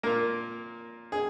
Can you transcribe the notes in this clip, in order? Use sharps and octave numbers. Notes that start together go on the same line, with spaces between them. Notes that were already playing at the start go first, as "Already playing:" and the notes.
A#2 A#3 A#4
G#4